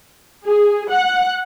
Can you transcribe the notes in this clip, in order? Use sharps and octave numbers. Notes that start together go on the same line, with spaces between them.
G#4
F#5